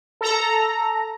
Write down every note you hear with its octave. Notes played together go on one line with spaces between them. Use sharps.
A4 A#5